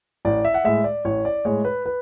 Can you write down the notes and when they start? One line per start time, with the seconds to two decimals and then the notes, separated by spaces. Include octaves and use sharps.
0.25 A1 D5
0.45 E5
0.54 F#5
0.64 A2 G#3 E5
0.84 D5
1.05 A1 C#5
1.25 D5
1.45 A2 G#3 C#5
1.65 B4
1.86 B4